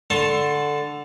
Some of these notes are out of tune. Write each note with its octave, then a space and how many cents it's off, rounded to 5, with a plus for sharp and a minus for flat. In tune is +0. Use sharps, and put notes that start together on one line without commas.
D3 +0 A5 +0 C6 +40